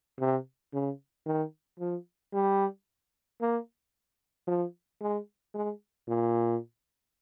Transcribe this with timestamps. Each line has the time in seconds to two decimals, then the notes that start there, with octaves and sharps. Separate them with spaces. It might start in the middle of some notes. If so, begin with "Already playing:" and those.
0.20 C3
0.73 C#3
1.26 D#3
1.79 F3
2.33 G3
3.41 A#3
4.47 F3
5.01 G#3
5.54 G#3
6.08 A#2